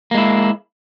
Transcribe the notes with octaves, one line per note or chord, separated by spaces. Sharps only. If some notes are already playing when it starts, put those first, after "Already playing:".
G#3 A#3 E4